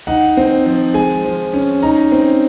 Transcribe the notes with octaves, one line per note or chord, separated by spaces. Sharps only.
D#4 F#5
C4
F3
G#3 G#5
F3
C#4
D#4 A#5
C4